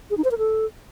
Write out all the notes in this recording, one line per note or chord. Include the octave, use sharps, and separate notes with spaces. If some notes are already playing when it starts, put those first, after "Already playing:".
G#4
D#4
C5
A#4
A4